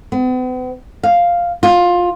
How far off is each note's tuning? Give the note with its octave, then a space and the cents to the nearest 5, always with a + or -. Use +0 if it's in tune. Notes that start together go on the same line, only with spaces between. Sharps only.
B3 +45
F5 +0
F4 +15